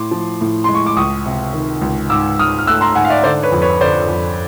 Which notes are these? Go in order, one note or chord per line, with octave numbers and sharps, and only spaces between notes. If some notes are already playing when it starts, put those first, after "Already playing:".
Already playing: A2 C6 D6
F3
A2
G#3 C6
C#6
D6
C#2 C#6 D#6
C3
D#3
C#2
G#2 D6 E6
G#2 D#6 F6
F6
A3 E6 F#6
A#5 C6
G#2 F#5 G#5
F5
D5 E5
D3 C5 D5
B4 C#5
F2
B4 C#5
D3 C5 D5
F2